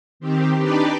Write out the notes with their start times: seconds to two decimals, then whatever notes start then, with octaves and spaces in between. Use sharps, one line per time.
0.20 D#3 C4 G4
0.58 D4 D#4 G4 B4 D5